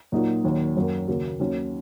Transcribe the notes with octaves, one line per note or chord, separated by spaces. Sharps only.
A#2 F#3 A#3 D#4 F#4
D#2 D#3 F#3
F#2 F#3 A#3
D#2 C#3 A#3 F#4
D#2 D#3 F#3 C#4 F#4